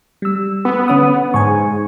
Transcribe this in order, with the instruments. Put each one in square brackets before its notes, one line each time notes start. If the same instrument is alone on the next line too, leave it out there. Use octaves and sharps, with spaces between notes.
[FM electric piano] G3 E6
[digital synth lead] B3
[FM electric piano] D3 C#4 D#6
[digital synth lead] G#2 [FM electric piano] G#5 C#6